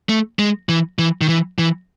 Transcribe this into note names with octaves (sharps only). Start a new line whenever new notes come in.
A3
G#3
E3
E3
D#3
E3
E3